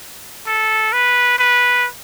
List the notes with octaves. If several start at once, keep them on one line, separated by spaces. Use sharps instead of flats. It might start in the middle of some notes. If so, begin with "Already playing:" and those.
A4
B4
B4